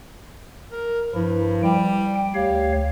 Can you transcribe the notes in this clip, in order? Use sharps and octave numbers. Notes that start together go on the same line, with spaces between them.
A#4
G2 F3 E4
G3 G5
D2 G4 C#5 F5